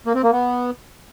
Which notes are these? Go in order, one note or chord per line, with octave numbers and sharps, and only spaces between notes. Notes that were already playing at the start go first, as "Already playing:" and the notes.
A#3
C4
A#3
B3